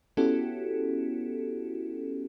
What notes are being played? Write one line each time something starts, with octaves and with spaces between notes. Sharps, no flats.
B3 C#4 E4 F#4 G4 A4